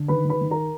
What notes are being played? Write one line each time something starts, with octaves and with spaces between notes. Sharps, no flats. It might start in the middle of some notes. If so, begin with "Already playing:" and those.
Already playing: D3
D#3 B4 B5
D#3
B4 B5
D#3
A#4 A#5